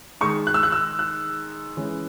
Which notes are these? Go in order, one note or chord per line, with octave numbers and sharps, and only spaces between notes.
D#3 G#3 D#4 C#6
F#6
E6
F#6
E6
F#6
E3 G#3 C#4